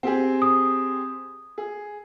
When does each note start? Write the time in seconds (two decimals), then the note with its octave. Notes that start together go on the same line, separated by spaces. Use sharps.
0.03 C4 G4 G#4
0.42 D#6
1.58 G#4